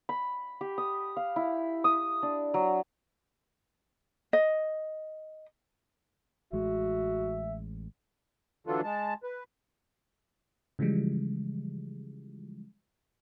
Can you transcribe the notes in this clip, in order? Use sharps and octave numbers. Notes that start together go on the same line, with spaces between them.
B5
G4
D#6
F5
E4
D#6
D4
F#3
D#5
A1 G#3 F#4 E5
D3 E3 F#3 D4 F4 A4
G#3 A5
B4
C#3 E3 F3 G3 G#3